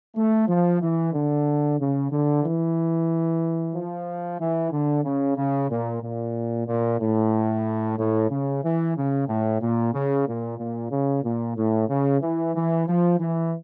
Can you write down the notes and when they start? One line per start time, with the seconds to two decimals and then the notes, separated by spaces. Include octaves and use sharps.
0.16 A3
0.48 F3
0.81 E3
1.14 D3
1.79 C#3
2.11 D3
2.44 E3
3.74 F3
4.39 E3
4.72 D3
5.04 C#3
5.37 C#3
5.70 A#2
6.02 A#2
6.67 A#2
7.00 A2
7.98 A2
8.30 C#3
8.63 E3
8.96 C#3
9.28 A2
9.61 A#2
9.94 C#3
10.27 A#2
10.58 A#2
10.91 C#3
11.24 A#2
11.56 A2
11.89 C#3
12.22 E3
12.55 E3
12.88 F3
13.19 E3